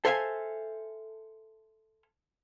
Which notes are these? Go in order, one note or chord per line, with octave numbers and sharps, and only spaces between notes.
A4 C5 E5 F5 G5 G#5